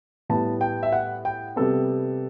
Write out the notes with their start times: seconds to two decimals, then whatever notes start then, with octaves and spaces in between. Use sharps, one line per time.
0.29 A2 G3 B3 A5
0.61 G5
0.83 E5
0.93 F#5
1.25 G5
1.56 C3 G3 B3 A4